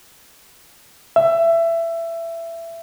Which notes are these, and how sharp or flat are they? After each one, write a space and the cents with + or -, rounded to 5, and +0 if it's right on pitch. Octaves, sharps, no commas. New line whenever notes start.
E5 +20